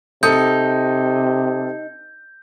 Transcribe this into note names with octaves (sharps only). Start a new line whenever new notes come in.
C3 D#4 A4 D#6 G6 C#7